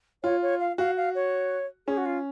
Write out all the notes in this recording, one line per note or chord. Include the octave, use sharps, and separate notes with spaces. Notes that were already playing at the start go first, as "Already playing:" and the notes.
F4 C#5
C#5
F5
F#4 F5
F5
C#5
C#4 G#4
F#4
F4